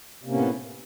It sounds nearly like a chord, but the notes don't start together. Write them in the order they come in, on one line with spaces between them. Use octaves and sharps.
C3 A#3 C#4 A2 B3